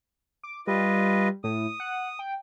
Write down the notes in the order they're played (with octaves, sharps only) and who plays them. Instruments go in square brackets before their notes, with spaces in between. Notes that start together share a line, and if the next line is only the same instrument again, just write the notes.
[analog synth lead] D6
[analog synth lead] G3 [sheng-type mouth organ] F4 B4 D#5
[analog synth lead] A2 [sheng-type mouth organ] D#6
[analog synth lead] F#5
G5